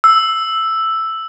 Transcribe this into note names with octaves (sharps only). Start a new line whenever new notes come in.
E6